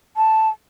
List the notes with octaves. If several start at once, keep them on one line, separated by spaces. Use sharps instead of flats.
A5